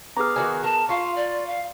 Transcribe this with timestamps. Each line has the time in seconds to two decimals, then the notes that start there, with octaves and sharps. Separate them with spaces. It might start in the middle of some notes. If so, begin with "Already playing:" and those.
0.17 B3 G#4 A#5 D6 F6
0.36 D#3 F#4 G#5
0.64 A#4 A5
0.89 F4 F5 C6 C#6
1.16 D5
1.47 F5